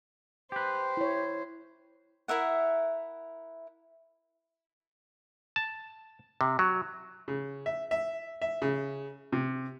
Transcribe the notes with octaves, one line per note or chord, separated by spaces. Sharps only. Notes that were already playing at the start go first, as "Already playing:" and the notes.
G4 B4 C5
E4 C#5
E4 A#4 E5 F#5
A5
C3
F#3
C#3
E5
E5
E5
C#3
C3